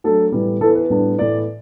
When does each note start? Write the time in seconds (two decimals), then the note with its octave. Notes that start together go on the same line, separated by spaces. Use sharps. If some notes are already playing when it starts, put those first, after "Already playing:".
0.04 F#3 A3 D4 A4
0.32 A2 E3 G3 B3
0.61 E3 B3 E4 A4
0.75 B4
0.90 A2 G3 B3 D4
1.18 A2 E3 B3 E4 D5